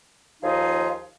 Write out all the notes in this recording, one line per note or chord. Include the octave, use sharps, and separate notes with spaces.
D#2 F3 D#4 G#4 F5